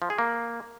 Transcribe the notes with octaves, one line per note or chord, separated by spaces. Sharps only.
F3
G#4
A#3